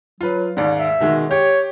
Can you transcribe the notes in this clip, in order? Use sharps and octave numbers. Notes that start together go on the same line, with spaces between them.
F#3 F4 B4
D#2 G#2 D5
E5
B2 D#3 G#3
G4 C#5